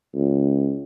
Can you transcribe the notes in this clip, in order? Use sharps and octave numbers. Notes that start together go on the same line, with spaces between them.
C#2